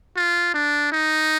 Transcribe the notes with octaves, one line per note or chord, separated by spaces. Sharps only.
F4
D4
D#4